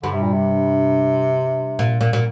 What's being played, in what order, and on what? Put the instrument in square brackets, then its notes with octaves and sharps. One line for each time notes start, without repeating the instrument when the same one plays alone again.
[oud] G2 [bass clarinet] D3
[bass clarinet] C3
A#2
C3
[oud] A#2
A#2
A#2